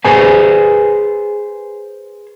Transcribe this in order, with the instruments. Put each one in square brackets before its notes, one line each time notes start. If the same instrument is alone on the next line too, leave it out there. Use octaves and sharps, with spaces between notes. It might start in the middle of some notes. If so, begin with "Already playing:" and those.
[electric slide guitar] G#4 B4 C5 G#5